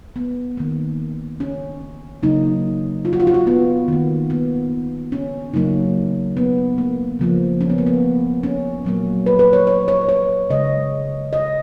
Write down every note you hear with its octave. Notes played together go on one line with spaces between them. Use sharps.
B3
D#3 A#3
C#4
C#3 F#3 A#3 D#4
F4
F#4
F4
F#4
F4
B3
D#3 A#3
B3
C#4
C#3 F#3 A#3 D#4
B3
A#3
C#3 F3 A#3
C#4
B3
A#3
B3
C#4
A#2 F#3 A#3
B4
B4
C#5
C#5
C#5
C#5
C#3 G#3 D#5
D#5